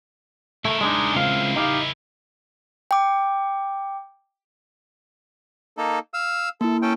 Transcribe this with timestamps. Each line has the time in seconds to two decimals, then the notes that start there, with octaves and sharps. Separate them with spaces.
0.65 A3 E4 A#4
0.81 G#3 D4 D#4
1.15 C#2 C4 F5
1.56 D#4 G4 F5
2.91 G5 D6
5.77 A#3 D#4 A4
6.14 F5 E6
6.61 A#3 E4 A4
6.82 C#4 A4 G5